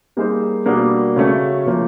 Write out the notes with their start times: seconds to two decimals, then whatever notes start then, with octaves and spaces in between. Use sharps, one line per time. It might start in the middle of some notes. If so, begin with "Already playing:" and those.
0.17 G3 A#3 D#4 G#4 C5
0.66 B2 G3 A#3 D4
1.16 C#3 F#3 A3 C#4
1.66 C#3 F3 A#3